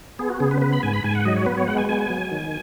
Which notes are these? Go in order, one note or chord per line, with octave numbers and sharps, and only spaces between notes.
B3 G#4
F#4
C#3 G#4
B4
B3 B4
B5
G#2 G#5
B5
G#2 G#5
F#5
F#3 D#5
C#5
B3 B4
C#5
G#3 F#5
G#5
B3 G#5
F#3
D#3